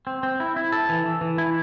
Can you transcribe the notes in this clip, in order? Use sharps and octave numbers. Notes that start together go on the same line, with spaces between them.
C4
C4
E4
E4
A4
E3
E3
E3
E4